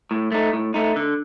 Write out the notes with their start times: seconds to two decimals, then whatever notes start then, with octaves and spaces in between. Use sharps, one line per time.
0.11 A2
0.32 A3 D#4
0.53 A2
0.74 A3 D#4
0.96 D3